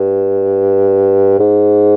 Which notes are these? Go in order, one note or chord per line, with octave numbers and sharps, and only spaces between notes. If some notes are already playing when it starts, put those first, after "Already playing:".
Already playing: G2
G#2